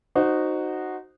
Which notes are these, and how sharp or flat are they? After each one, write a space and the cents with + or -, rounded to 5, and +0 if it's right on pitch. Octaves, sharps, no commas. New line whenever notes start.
D#4 -15 F#4 +0 C5 +0